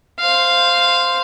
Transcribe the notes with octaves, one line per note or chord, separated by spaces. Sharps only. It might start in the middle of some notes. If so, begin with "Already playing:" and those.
C5 F5